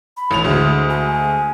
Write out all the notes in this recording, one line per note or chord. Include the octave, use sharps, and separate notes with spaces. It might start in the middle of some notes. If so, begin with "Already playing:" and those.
B5
A1 D#6 F7
D2 G#3
G#5